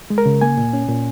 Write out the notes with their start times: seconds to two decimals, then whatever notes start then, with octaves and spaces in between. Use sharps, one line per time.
0.10 G#3
0.18 A#4
0.26 C#3
0.41 A#3 G#5
0.58 A#2
0.73 C#4
0.89 A#2